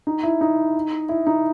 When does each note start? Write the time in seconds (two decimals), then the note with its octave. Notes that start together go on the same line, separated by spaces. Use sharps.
0.07 D#4
0.23 E4
0.41 D#4
1.09 E4
1.27 D#4